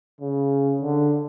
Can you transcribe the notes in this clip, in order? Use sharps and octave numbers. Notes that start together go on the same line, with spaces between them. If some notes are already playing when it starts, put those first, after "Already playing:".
C#3
D3